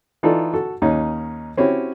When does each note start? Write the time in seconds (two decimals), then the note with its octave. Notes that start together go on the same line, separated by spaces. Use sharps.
0.23 E3 D#4 F4 A4 D5
0.54 F#4 A4
0.82 D#2 C#4 D#4
1.57 C4 C#4 E4 F#4 G4